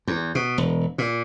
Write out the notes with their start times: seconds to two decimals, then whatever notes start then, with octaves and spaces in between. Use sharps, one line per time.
0.07 E2
0.35 B2
0.58 E1
0.98 A#2